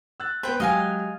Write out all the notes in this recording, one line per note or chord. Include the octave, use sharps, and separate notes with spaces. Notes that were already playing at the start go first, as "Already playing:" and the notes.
E6 F#6 A6
B3 B4 C5 G5
F#3 G#3 G4 D#5 F5 G#5